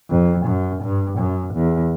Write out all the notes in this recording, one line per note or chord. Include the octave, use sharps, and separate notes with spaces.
F2
F#2
G2
F#2
E2